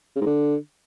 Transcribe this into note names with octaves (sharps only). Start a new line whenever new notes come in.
C#3
G#2
D3